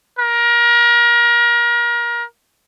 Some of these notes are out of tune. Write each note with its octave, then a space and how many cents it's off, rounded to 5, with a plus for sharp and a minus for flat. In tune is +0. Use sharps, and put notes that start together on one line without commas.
A#4 +30